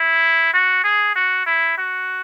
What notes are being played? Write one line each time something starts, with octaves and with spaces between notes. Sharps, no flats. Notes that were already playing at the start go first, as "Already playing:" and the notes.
Already playing: E4
F#4
G#4
F#4
E4
F#4